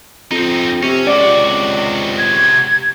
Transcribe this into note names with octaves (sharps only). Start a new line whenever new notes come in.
F2 C4 D#4
C3 C#4
C#2 C3 F#4 D5
G#6